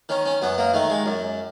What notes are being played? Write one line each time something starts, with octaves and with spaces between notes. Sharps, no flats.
D#3 C#4
C#4
F#2 B3
A#3
D#3 A3
G#3
F#2